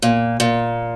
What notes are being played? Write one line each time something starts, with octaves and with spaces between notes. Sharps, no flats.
A#2
A#2